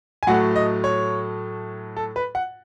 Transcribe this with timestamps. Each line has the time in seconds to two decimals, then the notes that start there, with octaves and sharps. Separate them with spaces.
0.23 G#5
0.27 A2 F#3 A3 F#5
0.56 D#5
0.84 C#5
1.97 A4
2.16 B4
2.35 F#5